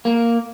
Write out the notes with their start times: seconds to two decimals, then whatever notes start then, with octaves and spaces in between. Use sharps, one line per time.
0.05 A#3